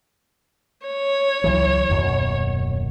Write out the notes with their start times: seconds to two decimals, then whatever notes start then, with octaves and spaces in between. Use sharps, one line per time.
0.86 C#5
1.44 C#2 E3 F#3
1.89 D#1 F#2 B2